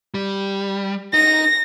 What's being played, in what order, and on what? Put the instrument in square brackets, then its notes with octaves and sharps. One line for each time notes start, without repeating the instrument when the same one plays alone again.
[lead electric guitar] G3
[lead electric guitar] D#4 [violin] A#6